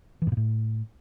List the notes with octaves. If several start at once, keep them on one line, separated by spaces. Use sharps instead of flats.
E3
G#2
A#2
A2